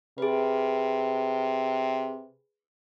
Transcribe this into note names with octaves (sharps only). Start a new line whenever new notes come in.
C3 G#4 B4